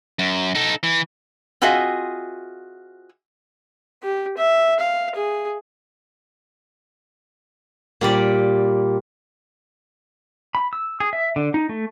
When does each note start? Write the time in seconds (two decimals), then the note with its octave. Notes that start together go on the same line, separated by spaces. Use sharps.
0.19 F#2
0.55 D#4 A4
0.83 E3
1.62 C4 F4 F#4 G#4 D#5 E5
4.03 G4
4.38 E5
4.80 F5
5.15 G#4
8.01 A#2 G3 D5
10.55 B5
10.73 E6
11.00 G#4
11.13 E5
11.36 D3
11.54 D#4
11.69 A3